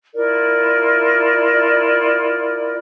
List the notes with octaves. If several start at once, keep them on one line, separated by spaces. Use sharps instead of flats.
E4 F4 A#4 D5